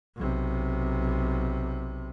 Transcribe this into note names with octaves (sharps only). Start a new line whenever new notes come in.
B1 C3